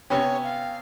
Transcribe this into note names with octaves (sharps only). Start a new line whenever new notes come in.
C3 B3 C#4 C#5 G5
F5